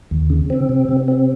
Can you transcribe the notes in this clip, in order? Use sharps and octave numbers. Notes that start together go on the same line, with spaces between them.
D#2
C#3
C4
C3
C3
C4